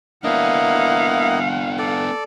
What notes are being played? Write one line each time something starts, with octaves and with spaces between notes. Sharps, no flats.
A#3 B3 D4 E4 D#5 F5 F#5
A4 D5